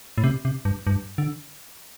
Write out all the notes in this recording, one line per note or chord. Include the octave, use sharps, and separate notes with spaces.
A2
C3
C3
G2
G2
D3